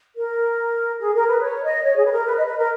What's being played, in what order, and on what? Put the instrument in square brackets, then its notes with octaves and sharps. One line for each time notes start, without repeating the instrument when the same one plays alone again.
[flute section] A#4
G#4
A#4
B4
C#5
D#5
C#5
G#4
B4
A#4
B4
D#5
B4
A#4